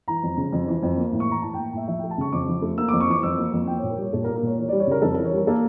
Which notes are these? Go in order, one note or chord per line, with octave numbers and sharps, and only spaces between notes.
E3 A#5
F2
C#3
F2
E3
F2
A#3
A2
C#6
E3 A#5
A2 A5
A#3 G5
A2 E5
F3 E5
A3 G5
A5
C#3 C#6
F2 D6
F3
A3
A#3 E6
F2 D6
C#6
E3 D6
F2 E6
A#3
F2
A#3 G5
A#2 C#5
A#4
G3 C#5
A#2 A4
A#4
A#3
A#4
A#2 C#5
E3 C#5
G3 D5
C#5
C#3 A#4
F2 A4
E3 A#4
C#5
G3 A#4
A#3 A4